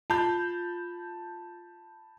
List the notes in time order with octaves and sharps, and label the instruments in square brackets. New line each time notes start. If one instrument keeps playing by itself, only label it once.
[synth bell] F4 [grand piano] A5 B5 G6